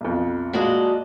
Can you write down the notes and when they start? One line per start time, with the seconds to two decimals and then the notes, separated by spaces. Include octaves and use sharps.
0.01 B1 F2
0.53 A#1 G#3 F#4 D5 D#5 F5